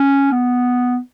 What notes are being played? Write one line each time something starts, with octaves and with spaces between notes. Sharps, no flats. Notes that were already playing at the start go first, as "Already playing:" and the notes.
Already playing: C#4
B3